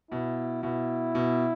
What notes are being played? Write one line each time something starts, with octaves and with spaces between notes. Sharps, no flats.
B2 E4
B2 E4
B2